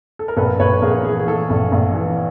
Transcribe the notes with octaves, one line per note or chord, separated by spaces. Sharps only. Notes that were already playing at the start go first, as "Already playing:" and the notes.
A4
A#4
A#1 A4 B4
A#1 B4 C#5
A#1 G#4 A#4
E3 G#4
G#4
E3 A4
A#1
A#1
E3